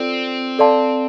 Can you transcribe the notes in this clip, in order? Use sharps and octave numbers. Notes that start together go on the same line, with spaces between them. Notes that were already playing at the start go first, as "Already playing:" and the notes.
Already playing: C4 F4 A4 D5
A4 D5 F5 A5 C6